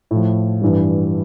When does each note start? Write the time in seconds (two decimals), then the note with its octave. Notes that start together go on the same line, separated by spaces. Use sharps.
0.11 A2 F3
0.62 G2 E3 G3